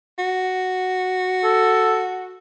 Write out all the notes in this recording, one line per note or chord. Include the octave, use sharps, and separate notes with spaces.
F#4
A4